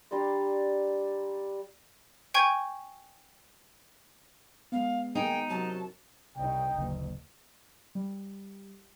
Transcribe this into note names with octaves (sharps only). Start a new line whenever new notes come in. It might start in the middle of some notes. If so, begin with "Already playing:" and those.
G3 D4 A#5 C6
G5 G#5 C#6 G6 G#6
G#3 B3 F5
D#3 A#3 D#4 G#4 G5
F#2 C3 F#3 A5
C2 D#4 G5
F#1 D2 A#2
G3